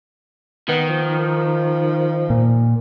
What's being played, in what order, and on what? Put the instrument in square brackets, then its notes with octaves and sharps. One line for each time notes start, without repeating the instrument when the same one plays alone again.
[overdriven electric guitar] D#3 [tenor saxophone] B3
[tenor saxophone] F3
[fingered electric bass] A#2